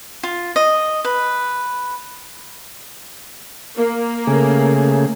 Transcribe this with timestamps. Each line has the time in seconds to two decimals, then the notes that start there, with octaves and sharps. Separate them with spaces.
0.23 F4
0.56 D#5
1.05 B4
3.77 A#3
4.27 C#3 A3 G#4